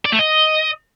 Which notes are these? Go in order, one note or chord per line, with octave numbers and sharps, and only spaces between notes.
D5
A3
D#5